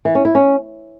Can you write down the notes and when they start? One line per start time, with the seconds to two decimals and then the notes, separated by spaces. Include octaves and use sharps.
0.05 E3
0.15 C#4
0.25 E4
0.35 C#4